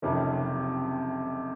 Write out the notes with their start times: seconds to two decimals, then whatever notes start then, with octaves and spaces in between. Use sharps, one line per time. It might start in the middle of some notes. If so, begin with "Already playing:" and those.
0.02 F#1 F2 C3 D#3 C#4